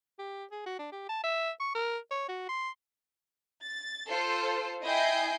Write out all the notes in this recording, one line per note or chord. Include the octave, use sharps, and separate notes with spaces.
G4
G#4
F#4
D4
G4
A5
E5
C#6
A#4
C#5
F#4
C6
A6
F4 A4 C5 C7
E4 D#5 G5 G#5 G6 C7